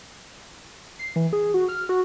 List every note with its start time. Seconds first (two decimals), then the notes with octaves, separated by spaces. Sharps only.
0.99 C7
1.16 E3
1.33 G#4
1.54 F#4
1.69 F6
1.89 F#4